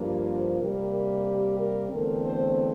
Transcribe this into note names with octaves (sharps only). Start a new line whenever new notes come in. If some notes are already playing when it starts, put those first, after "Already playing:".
Already playing: G2 F3 A#3
C5
C3 G3 A#3 A#4
A#4
G4
A#4
E2 D3 A3 C4 A#4
C5